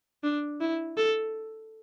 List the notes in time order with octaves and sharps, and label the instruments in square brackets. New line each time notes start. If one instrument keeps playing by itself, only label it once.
[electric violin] D4
E4
A4